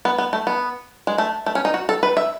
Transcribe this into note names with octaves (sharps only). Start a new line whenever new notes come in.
B3
B3
A3
B3
G#3
A3
A3
C#4
D#4
F#4
A4
B4
E5